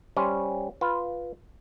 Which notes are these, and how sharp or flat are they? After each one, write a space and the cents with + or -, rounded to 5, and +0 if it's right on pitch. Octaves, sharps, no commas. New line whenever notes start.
G3 +0 C#4 +0 C5 +0
F4 +0 B4 +0